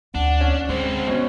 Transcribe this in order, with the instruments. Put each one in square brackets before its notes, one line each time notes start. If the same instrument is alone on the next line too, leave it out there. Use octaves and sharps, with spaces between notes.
[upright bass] D2 D#4 [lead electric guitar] D4 [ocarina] F#5
[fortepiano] C#4
[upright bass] D3 [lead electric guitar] G#3 C4 [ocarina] C5
[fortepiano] B2 C#4